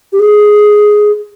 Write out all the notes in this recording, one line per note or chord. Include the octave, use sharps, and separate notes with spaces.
G4
G#4